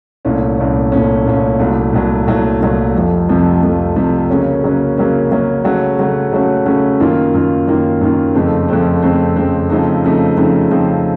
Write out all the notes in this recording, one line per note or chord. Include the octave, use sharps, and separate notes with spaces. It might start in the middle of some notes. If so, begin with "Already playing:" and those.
C2 A#2 A3 C#4
C2 A#2 A3 C#4
C2 A#2 A3 C#4
C2 A#2 A3 C#4
C2 A#2 F#3 A3
C2 A#2 F#3 A3
C2 A#2 F#3 A3
C2 A#2 F#3 A3
F2 C3 F3 A3
F2 C3 F3 A3
F2 C3 F3 A3
F2 C3 F3 A3
C#3 F#3 A#3 C#4
C#3 F#3 A#3 C#4
C#3 F#3 A#3 C#4
C#3 F#3 A#3 C#4
C#3 F#3 A3 C#4 F#4
C#3 F#3 A3 C#4 F#4
C#3 F#3 A3 C#4 F#4
C#3 F#3 A3 C#4 F#4
F#2 D#3 A#3 F4
F#2 D#3 A#3 F4
F#2 D#3 A#3 F4
F#2 D#3 A#3 F4
F2 C#3 A3 C4
F2 C#3 A3 C4
F2 C#3 A3 C4
F2 C#3 A3 C4
C#3 F3 A3 C4 D#4
C#3 F3 A3 C4 D#4
C#3 F3 A3 C4 D#4
C#3 F3 A3 C4 D#4